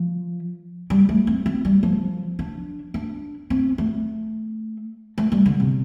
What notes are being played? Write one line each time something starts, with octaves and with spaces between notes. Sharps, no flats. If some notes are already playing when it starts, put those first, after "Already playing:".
Already playing: F3
G3
A3
C4
C4
G3
F3
D4
D4
C4
A3
A3
G3
D3
C3